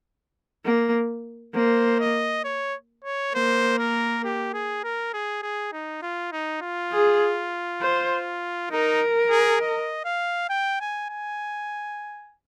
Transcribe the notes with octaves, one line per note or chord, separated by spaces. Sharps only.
A#3
A#3 C5
D#5
C#5
C#5
A#3 C5
A#4
G4
G#4
A#4
G#4
G#4
D#4
F4
D#4
F4
G#4
C5
D#4 A#4
G#4
D#5
F5
G5
G#5
G#5